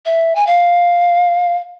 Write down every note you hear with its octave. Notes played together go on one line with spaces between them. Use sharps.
E5
G#5
F5